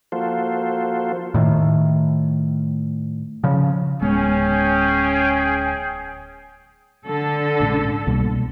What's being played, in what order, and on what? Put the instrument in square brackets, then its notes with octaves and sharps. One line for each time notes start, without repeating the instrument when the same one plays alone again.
[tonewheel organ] F3 A#3 F4 F#4 A4 C5
[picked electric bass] A2 D#3
C#3 F3
[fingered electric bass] D1 G#3 B3 [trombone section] C#4 [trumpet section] G#4 G5
[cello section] D3 A4
[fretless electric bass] A#1 G#2 C#3
[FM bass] C2 [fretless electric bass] B2 G3 A#3